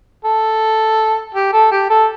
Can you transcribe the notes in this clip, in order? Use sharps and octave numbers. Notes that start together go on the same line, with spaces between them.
A4
G4
A4
G4
A4